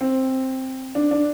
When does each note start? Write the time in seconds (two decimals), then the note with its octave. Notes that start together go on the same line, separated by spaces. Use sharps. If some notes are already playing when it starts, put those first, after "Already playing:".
0.01 C4
0.95 D4
1.11 D4